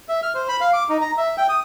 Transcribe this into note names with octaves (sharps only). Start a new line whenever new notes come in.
E5
F6
C5
B5
F5
D6
D#4
A#5
E5
G5
D#6